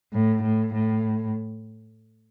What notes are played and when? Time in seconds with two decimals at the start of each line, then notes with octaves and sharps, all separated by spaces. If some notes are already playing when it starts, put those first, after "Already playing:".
0.13 A2
0.43 A2
0.73 A2